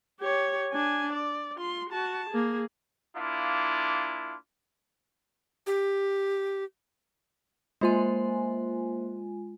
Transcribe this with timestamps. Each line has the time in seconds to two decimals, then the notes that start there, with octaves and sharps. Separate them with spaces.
0.20 G4 C#5
0.72 D4 G#5
1.13 D5
1.56 F4 C6
1.90 F#4 A5
2.30 A#3 G#4
3.16 A#3 D4 E4 F4
5.67 G4
7.81 G#3 A#3 F4 C5 G#5 C6